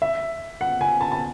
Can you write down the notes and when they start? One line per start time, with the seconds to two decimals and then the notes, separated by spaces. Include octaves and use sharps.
0.02 E5
0.61 F#5
0.81 G#5
1.01 A5
1.12 A5